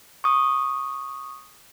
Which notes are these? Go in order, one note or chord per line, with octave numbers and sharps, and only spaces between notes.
C#6 D#6